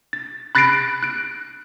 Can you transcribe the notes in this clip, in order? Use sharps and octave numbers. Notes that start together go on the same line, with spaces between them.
A6
B5 F#6 A6 A#6 C7 D7
F#6 D7